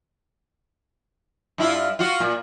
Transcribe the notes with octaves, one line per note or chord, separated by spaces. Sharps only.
G2 E4 F4
F4 F#4
A#2